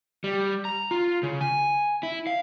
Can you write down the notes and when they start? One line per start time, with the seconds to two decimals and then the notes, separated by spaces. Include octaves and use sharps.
0.24 G3
0.65 A#5
0.91 F4
1.23 C#3
1.41 G#5
2.03 E4
2.27 F5